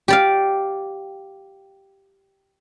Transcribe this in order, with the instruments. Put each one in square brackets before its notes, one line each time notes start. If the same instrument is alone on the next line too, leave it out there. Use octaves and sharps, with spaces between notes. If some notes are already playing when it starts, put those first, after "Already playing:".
[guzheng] G4 D5 F5